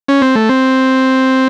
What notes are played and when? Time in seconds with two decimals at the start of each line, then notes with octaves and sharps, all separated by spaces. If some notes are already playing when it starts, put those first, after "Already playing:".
0.08 C#4
0.22 C4
0.35 A3
0.49 C4